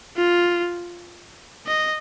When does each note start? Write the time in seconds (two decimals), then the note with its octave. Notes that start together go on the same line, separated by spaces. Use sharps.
0.16 F4
1.67 D#5